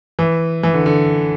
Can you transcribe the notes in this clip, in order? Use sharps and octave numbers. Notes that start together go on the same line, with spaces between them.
E3
E3
D3
D3